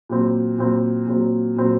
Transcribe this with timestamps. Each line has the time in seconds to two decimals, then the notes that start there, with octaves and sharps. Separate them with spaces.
0.09 A#2 F#3 C4
0.58 A#2 F#3 C4
1.07 A#2 F#3 C4
1.56 A#2 F#3 C4